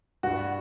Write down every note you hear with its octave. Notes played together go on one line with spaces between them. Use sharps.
G2 F#4